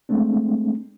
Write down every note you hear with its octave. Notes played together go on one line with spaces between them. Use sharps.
G#3 A3 C4 D4